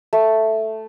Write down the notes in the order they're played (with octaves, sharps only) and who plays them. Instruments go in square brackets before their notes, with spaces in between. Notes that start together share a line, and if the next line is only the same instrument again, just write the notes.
[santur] A3